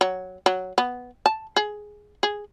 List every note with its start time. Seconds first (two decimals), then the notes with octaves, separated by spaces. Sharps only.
0.01 F#3
0.46 F#3
0.78 B3
1.26 A5
1.56 G#4
2.23 G#4